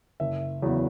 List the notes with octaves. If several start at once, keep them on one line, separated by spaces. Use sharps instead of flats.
F#1 E5
E2 C#3 F#3 B3